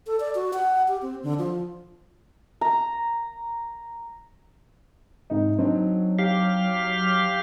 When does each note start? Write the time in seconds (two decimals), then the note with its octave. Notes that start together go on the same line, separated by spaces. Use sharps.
0.07 A4
0.20 D5
0.35 F#4
0.53 F#5
0.88 G4
1.02 C4
1.23 D3
1.39 F3
2.61 A#5
5.30 G#2 C3 D#4
5.59 F#3 C4 D4 D#4
6.19 G4 F5